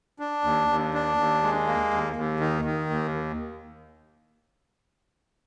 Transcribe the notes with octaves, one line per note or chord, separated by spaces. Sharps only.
D4
D#2
D#2
D4
D#2
G#3
A#3
D#2
D#2
D#3
D#3
D#2